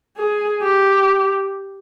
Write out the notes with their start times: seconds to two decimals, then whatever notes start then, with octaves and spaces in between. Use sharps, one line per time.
0.17 G#4
0.62 G4